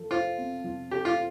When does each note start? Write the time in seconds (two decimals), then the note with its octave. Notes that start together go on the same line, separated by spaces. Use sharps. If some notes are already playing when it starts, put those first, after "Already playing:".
Already playing: F3 A4
0.11 F4 C5
0.38 C4
0.64 F3
0.91 G4 A4
1.05 F4